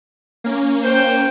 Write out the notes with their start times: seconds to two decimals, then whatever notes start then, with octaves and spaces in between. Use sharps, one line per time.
0.44 A#3 C#4
0.82 C5 G5